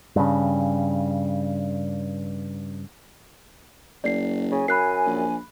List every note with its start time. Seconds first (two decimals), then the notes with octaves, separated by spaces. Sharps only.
0.16 G2 C#3
4.04 F#1 D5 C7
4.52 C#3 G#5
4.68 F#2 B5 F#6 C7
5.06 A#1